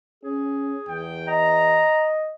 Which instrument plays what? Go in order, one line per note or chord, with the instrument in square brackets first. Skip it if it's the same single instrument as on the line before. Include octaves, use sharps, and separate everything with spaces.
[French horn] C#4 [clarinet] G#4
[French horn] E2 [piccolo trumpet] G5
[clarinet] D#5 [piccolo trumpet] A#5